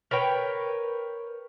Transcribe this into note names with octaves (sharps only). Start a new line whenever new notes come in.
A#4 B4 C#5 G5